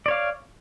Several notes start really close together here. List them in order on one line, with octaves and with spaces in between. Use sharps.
D5 C#5 F5